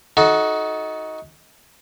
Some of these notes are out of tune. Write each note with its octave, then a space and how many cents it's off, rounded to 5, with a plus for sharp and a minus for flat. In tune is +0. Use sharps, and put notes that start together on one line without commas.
D#4 +20 F#4 +0 A4 -20